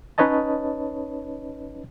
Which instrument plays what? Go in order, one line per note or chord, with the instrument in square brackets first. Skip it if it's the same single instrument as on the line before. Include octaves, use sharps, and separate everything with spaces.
[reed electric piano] C#4 D#4 B4 C#5 D#5 A5